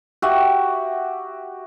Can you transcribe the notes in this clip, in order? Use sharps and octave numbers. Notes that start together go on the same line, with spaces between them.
F#4 G4 E5